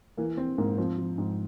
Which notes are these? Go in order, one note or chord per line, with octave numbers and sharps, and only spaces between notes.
E3 A#3
E3 C4
G#2 A#3
F3 C4
F3
G#2